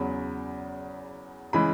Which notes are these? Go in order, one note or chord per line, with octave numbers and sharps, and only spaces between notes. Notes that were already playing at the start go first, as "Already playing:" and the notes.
Already playing: E2 C#3 F#3 B5
C#3 E3 G#3 B5